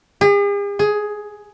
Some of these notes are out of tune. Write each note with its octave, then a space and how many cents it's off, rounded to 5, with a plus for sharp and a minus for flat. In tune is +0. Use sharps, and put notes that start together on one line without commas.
G#4 -45
G#4 +10